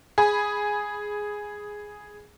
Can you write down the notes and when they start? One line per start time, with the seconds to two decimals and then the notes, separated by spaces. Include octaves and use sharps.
0.18 G#4 G#5 B5